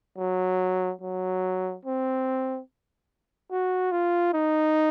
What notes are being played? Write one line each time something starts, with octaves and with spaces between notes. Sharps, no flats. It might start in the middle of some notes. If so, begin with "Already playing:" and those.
F#3
F#3
C4
F#4
F4
D#4